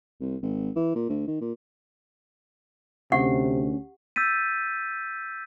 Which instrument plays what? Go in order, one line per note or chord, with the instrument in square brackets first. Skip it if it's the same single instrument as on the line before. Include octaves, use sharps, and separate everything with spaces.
[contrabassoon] C2
G#1
E3
A#2
D2
D#3
A#2
[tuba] D2 [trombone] C3 [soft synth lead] C#4 [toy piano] G4 F#5
[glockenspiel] E6 G6 A6 B6 D#7